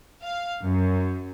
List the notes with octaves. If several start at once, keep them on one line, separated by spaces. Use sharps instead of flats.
F5
F#2